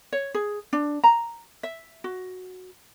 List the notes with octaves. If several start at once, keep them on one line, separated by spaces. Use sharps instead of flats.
C#5
G#4
D4
A#5
E5
F#4